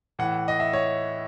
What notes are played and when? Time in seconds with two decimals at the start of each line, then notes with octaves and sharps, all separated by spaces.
0.19 A2 E3 F#5
0.48 D#5
0.60 E5
0.73 C#5